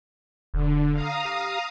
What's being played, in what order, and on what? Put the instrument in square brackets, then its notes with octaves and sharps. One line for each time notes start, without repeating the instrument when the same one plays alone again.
[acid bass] E1 [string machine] D3
[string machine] F5 A#5 D#6
[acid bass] G4